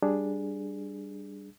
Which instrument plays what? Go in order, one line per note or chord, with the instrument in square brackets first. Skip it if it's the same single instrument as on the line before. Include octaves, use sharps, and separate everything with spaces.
[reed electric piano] G3 D4 G#4